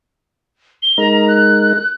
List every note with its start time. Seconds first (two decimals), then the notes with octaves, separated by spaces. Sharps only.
0.83 G7
0.98 G#3 D#4 A#4 A#5
1.28 F#6